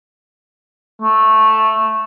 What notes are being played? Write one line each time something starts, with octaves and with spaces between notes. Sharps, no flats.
A3